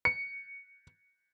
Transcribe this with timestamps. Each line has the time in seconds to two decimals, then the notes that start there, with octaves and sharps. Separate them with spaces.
0.05 C#7